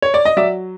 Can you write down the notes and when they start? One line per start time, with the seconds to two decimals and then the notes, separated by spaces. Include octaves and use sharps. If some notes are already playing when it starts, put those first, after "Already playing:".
0.02 C#5
0.14 D5
0.25 D#5
0.37 F#3 D5 E5